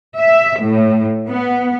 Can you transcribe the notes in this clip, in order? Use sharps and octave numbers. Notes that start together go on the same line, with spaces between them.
E5
A2
B3